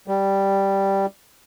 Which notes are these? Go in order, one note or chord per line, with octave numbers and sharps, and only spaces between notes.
G3